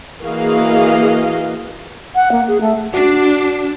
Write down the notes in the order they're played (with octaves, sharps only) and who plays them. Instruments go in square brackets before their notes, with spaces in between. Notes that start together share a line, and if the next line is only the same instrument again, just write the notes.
[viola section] E3 A#3 F#4 G#4 D#5 F5
[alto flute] F#5
A#3
G#4
A3
[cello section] D4 [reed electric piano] F#4